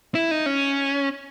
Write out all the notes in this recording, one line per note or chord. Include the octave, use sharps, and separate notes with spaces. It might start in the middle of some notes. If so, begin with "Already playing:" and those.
E4
D#4
C#4